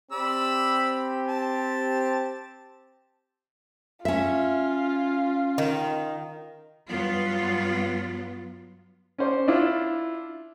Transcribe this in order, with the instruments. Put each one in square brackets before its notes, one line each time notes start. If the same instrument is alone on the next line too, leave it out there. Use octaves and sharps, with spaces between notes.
[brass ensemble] C4 G4 [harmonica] D5 B5 E6
[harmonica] A5
[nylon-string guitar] C#4 E5 [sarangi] F4
[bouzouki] D#3
[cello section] G2 F#3 B3 F4
[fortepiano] C#4 C5 D5
D4 E4 F4